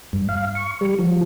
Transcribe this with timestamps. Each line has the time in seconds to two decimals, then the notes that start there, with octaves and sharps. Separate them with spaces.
0.13 G2
0.29 F5
0.55 C#6
0.81 G3
0.99 F3